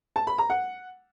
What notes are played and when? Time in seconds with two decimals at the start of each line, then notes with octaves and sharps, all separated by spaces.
0.16 A5
0.27 B5
0.38 A#5
0.50 F#5